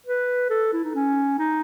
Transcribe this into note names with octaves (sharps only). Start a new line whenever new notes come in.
B4
A4
E4
D#4
C#4
D#4